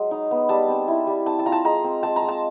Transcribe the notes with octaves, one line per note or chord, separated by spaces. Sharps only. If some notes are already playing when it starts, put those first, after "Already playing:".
Already playing: F#3 G#3
D#4
B3
G3 A5
C4
E4
G3
C4 A5
A5
F4 A#5
A5
G#3 A#5
C4
G#3 A5
A#5
G#3
A5